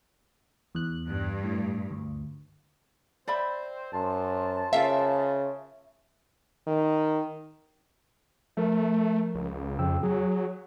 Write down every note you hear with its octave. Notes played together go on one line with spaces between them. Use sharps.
E2 F#6
G2
A2
D2
C4 C5 D5 E5 B5
F#2 C5 A5
C#3 F4 A#4 E5 F5
D#3
F3 A3 A#4
C#2
F2 C#3 G5 E6
F#3 G#4